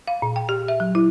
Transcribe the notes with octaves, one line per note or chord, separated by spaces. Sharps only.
F5
A#2
G5
G4
E5
F#3
E4